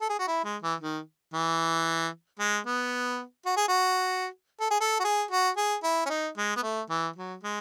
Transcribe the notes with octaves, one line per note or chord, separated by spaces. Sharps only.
A4
G#4
F#4
E4
G#3
E3
D#3
E3
G#3
B3
F#4
G#4
F#4
A4
G#4
A4
F#4
G#4
F#4
G#4
E4
C#4
D#4
G#3
B3
A3
E3
F#3
G#3